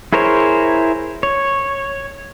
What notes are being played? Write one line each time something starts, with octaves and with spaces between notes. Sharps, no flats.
E4 G#4 A#4 C5 C#5
C#5